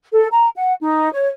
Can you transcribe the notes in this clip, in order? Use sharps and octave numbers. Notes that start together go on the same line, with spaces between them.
A4
A#5
F#5
D#4
C#5